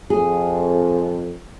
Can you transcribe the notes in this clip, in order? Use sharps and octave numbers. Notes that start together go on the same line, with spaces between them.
F2 G#4